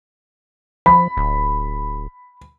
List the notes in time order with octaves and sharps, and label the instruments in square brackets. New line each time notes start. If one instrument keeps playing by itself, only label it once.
[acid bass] F3 [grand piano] B5
[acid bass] D1